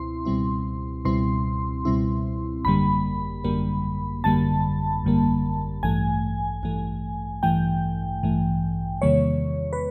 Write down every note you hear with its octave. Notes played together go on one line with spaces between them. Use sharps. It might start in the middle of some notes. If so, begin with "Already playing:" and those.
Already playing: C#2 B2 C4 E4 C6
C#2 B2 G3 C4 E4
C#2 B2 G3 C4 E4 C6
C#2 B2 G3 C4 E4
G#1 F#2 D3 G3 A#3 B5
G#1 F#2 D3 G3 A#3
G#1 F#2 D3 G3 A#3 A5
G#1 F#2 D3 G3 A#3
A1 G2 E3 A3 G#5
A1 G2 E3 A3
A1 G2 E3 A3 G5
A1 G2 E3 A3
E2 C3 D#3 G3 A#3 C#5
B4